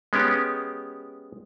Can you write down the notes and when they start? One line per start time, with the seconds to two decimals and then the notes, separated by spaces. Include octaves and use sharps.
0.13 G#3 B3 C#4 G4